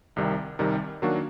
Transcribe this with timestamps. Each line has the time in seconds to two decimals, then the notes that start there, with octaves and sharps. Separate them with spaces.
0.16 C2 C3 D#3 G3
0.59 C2 C3 D#3 G3
1.02 D#3 F#3 A#3 D4 F#4